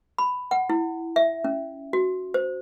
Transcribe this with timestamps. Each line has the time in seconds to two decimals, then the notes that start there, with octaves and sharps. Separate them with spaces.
0.18 B5
0.51 F#5
0.70 E4
1.16 E5
1.44 C#4
1.93 F#4
2.34 C5